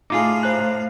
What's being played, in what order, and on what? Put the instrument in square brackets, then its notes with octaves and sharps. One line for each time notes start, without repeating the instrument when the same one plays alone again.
[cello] A2 F5 [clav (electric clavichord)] D#4 F4 G#4 [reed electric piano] D6
[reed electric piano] C5 A#5 F#6